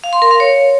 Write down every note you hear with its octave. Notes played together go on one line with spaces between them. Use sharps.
F5
C6
A#4
F5
C#5